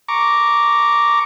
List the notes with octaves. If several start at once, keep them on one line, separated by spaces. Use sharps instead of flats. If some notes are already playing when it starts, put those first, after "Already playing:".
A#5 C#6 D6